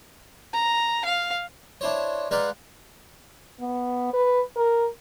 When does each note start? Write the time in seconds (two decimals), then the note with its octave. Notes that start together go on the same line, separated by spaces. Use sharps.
0.53 A#5
1.05 F5
1.81 D4 E4 C5 C#5
2.31 G#3 D#4 B4 D5 F5 F#5
3.60 B3
4.13 B4
4.56 A#4